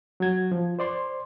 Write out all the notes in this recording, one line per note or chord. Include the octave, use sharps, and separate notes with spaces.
F#3 G#6
F3
C5 D5 C6